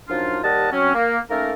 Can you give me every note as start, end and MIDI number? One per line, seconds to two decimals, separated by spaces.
0.09 0.38 42
0.09 0.38 53
0.09 0.38 62
0.09 0.38 63
0.09 0.38 65
0.44 0.69 39
0.44 0.69 55
0.44 0.69 70
0.44 0.69 75
0.44 0.69 78
0.44 0.69 81
0.72 0.93 54
0.72 0.93 60
0.72 0.93 61
0.95 1.19 58
1.30 1.53 57
1.30 1.53 58
1.30 1.53 61
1.30 1.53 63
1.30 1.53 69
1.30 1.53 70